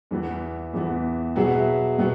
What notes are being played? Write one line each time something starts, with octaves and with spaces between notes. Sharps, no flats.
E2 E3 B3
E2 E3 B3
B2 F#3 B3 G#4 E5
B2 F#3 B3